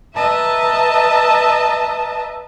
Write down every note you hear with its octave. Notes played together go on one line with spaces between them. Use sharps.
B4 D#5 E5 A5 A#5